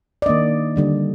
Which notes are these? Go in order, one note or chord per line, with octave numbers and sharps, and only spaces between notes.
D5
D#3 A#3 D4 D#5
D3 G3 D4